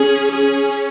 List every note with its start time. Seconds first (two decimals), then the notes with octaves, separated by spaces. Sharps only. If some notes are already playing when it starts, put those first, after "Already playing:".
Already playing: C#4 G#4
0.32 G#4